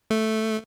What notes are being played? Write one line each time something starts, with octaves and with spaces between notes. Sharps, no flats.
A3